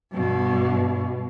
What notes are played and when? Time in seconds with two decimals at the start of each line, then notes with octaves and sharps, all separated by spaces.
0.13 G2 B2